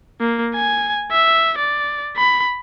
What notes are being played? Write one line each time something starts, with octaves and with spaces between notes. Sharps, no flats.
A#3
G#5
E5
D5
B5